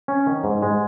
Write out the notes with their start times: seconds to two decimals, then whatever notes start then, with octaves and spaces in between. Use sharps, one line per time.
0.08 C#4
0.27 D#3
0.44 G#2
0.62 G#3